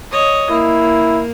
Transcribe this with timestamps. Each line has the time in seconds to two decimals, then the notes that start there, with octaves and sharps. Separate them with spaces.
0.11 C#5 D#5
0.50 A#3 E4